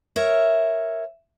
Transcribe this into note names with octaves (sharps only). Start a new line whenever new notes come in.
A#4 C#5 E5